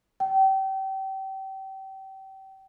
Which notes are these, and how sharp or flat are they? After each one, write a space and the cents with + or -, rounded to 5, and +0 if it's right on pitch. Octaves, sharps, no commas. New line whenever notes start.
G5 -30